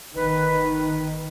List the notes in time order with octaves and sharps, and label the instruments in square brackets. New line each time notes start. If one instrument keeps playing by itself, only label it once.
[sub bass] G1 [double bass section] D#3 [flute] B4